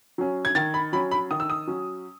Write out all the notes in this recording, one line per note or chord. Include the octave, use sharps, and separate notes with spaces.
F#3 C#4
G#6
D#3 A6
B5
F#3 C#4 B5
B5
D#3 D#6
E6
D#6
F#3 C#4